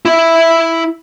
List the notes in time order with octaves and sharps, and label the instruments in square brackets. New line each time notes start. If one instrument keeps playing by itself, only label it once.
[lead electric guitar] E4 E5